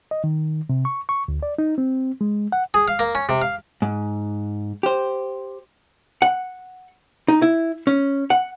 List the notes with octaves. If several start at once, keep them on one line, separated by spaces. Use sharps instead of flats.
D#5
D#3
C3
C#6
C#6
D2
D5
D#4
C4
G#3
F#5
G#4
F5
A#3
C#4
C3
F5
G#2
G4 C5
F#5
D#4
E4
C#4
F#5